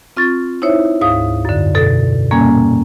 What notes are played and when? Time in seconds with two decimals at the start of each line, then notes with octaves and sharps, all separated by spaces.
0.17 C4 F4 C#6 A6
0.62 D#4 E4 C5 C#5 E5
1.01 D2 G#2 F5 D#6
1.45 F#2 D3
1.75 B2 A4
2.31 A#2 G3 A#3 C#4 G#5 G#6